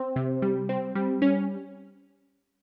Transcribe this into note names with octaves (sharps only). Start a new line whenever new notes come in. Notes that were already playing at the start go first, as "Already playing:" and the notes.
Already playing: C4
C3
G3
C4
G3
C#4